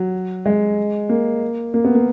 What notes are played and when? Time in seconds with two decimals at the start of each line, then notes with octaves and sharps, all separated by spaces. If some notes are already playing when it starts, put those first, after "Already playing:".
Already playing: F#3
0.46 G#3
1.09 A#3
1.74 A#3
1.85 B3
1.95 A#3